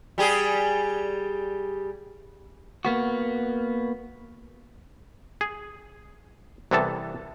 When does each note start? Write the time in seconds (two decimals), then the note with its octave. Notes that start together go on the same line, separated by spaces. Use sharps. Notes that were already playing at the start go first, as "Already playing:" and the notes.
0.18 G3 G4 G#4
2.85 A#3 B3 F#4
5.41 G#4
6.71 C2 C3 E3 B3 A4 A5